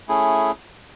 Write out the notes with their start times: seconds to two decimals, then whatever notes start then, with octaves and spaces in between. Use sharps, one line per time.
0.08 A3 C#4 E4 G#4